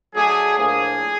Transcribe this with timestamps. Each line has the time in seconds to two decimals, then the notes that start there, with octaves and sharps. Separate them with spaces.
0.14 F#3 A3 D4 G#4
0.56 A2 F3 A#3 D4 G#4